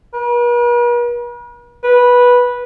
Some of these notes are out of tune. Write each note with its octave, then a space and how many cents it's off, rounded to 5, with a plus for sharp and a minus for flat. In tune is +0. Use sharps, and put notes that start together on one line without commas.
B4 -45
B4 -10